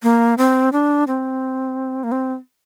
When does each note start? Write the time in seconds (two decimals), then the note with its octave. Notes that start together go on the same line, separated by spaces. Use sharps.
0.03 A#3
0.38 C4
0.73 D4
1.07 C4
2.04 A#3
2.12 C4